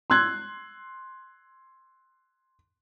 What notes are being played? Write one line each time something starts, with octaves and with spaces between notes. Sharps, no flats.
C6 E6 F#6 G#6